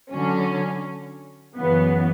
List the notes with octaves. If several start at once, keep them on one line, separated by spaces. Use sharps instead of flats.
D3 F#3 C#4
F#2 C#3 E3 B3